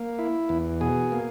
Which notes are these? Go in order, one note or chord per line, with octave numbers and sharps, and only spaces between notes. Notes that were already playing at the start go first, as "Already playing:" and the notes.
Already playing: A#3
E4
E2
B2 G#4
A#3